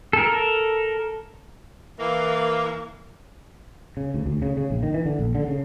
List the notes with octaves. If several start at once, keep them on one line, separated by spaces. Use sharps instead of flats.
A4 A#4
E3 A#3
C#3
D2
D2
C#3
C#3
A#1
D#3
E3
D3
A#1
D3
C#3